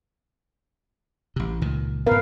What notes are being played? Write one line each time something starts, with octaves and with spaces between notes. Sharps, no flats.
A1 C3
C#2 A#2 D#3
G#2 B3 A#4 B4 F5